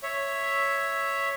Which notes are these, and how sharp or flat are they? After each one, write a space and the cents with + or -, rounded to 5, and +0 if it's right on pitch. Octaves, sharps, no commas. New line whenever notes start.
C#5 +0 E5 +0